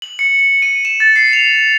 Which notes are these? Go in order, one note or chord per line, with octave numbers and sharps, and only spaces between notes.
F#7
C#7
C#7
D#7
E7
A6
C7
F7